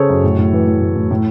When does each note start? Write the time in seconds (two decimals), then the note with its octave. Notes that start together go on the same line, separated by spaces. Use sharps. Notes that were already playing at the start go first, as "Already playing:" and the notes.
Already playing: C#3 G#4 A4 C5 C#5
0.09 F#2
0.24 A2
0.38 A2
0.53 E3
0.67 E3
0.81 A2
0.96 A2
1.11 A2